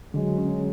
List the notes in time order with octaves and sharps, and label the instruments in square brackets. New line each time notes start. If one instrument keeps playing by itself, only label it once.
[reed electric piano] D3 [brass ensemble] F#3 G#3
[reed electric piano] C#4